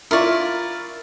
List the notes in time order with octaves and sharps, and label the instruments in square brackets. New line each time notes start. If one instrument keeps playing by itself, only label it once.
[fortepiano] E4 F4 C#6 [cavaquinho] A#4 D5